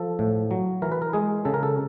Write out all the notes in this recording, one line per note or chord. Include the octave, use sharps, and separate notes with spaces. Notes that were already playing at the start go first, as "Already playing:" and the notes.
Already playing: F3 A4
A2
F#3
E3 A#4
B4
A#4
G#3 G#4
C#3 A4
A#4
A4